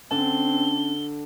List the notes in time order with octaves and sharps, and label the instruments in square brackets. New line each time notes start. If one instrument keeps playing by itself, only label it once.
[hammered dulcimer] D3 A5 [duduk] C4 [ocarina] C#4 [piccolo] G7